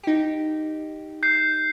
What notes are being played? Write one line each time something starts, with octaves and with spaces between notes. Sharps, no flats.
D#4 G4
G6 C7